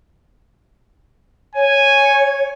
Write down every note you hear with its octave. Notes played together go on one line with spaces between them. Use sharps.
C#5 G#5